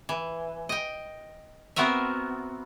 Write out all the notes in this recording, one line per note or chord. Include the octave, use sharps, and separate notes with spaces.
E3
D#5 G5
B3 C4 F#4 A#4 E5